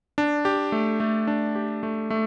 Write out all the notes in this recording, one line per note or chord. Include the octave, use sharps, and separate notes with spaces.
D4
G4
A3
A3
D4
G4
A3
A3